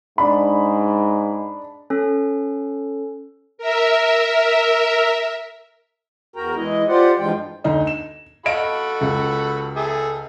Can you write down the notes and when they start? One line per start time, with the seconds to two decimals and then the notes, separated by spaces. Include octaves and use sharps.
0.18 G#2 D4 B5
1.90 C#4 A4
3.58 A#4 E5
6.36 E2 F#4 A#4 G5 A#5
6.56 E3 G#3 E4 D#5
6.88 F4 G4 C5 D5 F#5
7.19 G2 E3 F3 G#3 F4 G5
7.64 D2 D#4 D#5
7.87 E7
8.46 F#4 A4 D#5 F5 B5 D7
9.01 C#2
9.76 G#4 A4 E5